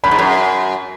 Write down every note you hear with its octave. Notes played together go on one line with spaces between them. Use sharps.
F#2 B5
G#2
F#2